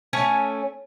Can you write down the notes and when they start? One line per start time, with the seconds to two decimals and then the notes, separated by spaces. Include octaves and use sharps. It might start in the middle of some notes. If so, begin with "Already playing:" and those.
0.13 A3 C#4 C#5 G#5